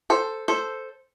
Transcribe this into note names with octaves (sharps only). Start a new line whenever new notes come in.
A4 C5
A4 C5